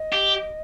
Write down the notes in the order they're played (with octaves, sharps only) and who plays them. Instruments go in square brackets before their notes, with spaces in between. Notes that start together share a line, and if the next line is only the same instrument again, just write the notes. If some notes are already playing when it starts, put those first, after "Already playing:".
Already playing: [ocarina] D#5
[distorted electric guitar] G4